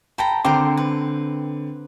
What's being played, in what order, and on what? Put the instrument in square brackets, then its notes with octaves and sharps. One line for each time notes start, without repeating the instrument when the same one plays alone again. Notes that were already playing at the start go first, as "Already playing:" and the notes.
[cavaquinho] A4 G5 A#5 [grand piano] B5
[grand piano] D3 C4 D6 [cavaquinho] A#4 C5 G5
[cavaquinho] B4